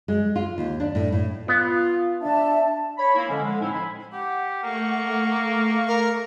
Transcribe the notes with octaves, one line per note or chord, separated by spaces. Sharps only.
G#3
F4
D#2
D4
A2
A2
B3 F4
D4 E5 A5
C#5 B5
A#3 E4
D3 F3 G#3 C#4
D3 G#3
A2 F3 C4 C#4 D#4 E4
D#4 C5 G#5 B5
G4 F#5
A3 A#3 C#6
F5
A#4